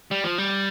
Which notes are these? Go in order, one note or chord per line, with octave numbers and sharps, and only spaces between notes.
G3
F3
G3